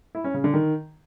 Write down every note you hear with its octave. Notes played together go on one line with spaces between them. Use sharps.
E4
C#4
C#3
D3
D#3